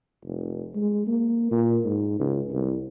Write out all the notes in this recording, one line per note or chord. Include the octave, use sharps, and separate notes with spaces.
F1
G#3
A#3
A#2
G#2
C#2
C2